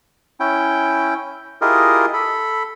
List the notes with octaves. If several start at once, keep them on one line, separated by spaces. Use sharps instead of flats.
C#4 E4 G5
E4 F4 G4 G#4 A#4 D#5
A4 B5